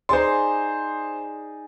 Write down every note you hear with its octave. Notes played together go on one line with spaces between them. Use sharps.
D#4 G#4 C5 D5 C6